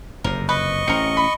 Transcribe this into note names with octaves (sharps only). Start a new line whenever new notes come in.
F#1 F2 C3 A#4
B4 D#5 C#6
A1 C4 C#4 A#4 C#7
B5